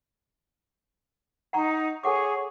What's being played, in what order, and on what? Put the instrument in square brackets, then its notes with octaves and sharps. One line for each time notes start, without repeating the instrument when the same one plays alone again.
[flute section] D#4 [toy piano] F#5 A#5 C#6
[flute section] G#4 C#5 C#6 [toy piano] A4 F#5 D6